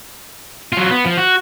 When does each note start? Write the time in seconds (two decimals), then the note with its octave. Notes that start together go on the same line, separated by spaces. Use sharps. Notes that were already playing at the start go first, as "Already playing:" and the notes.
0.73 F#3 F4
0.90 B3
1.05 F3
1.17 F#4